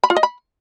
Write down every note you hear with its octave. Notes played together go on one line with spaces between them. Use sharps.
B5
F4
D#5
B5